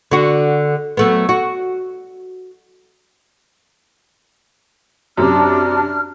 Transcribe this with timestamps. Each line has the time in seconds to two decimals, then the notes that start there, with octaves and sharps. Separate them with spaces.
0.11 D3 F#4
0.97 F#3 A3 B3
1.29 F#4
5.17 F#2 C3 D4 F6